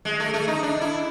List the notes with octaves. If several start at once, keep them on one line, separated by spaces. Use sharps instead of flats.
G#3
A3
A3
D#4
D4
E4